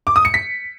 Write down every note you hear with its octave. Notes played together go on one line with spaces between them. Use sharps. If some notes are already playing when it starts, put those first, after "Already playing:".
D6
D#6
C#7
B6